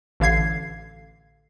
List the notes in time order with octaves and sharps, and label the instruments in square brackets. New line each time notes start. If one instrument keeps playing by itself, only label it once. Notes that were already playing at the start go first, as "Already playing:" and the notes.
[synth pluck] A1 D3 F5 G#6 C7